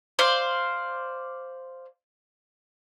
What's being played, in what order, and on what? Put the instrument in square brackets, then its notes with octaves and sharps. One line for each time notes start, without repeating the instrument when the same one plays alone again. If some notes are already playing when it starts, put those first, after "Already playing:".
[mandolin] C5 D5 F5